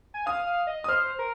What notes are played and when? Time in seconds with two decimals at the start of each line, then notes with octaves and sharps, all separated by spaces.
0.14 G#5
0.26 F5 D#6
0.47 F5
0.67 D#5
0.84 D#6
0.88 C5 F6
1.19 A#4